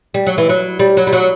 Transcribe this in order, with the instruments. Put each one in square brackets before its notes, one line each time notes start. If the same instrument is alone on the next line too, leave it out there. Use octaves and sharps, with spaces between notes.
[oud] G3
F#3
E3
F#3
G3
F#3
G3
F#3